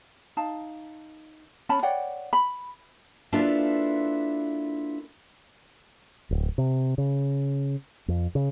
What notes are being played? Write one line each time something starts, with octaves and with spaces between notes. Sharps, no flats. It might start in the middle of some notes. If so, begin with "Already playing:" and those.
D#4 F5 A5
C#4 A5 B5
C#5 D5 F#5 G5
B5
A#3 D4 E4 F4 A4 B4
D1
C3
C#3
F2
C#3